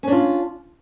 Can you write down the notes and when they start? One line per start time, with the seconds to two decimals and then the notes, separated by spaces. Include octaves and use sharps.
0.03 C#4
0.08 D4
0.12 F4